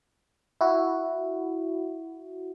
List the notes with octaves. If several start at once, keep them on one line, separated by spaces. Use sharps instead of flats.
E4 F#4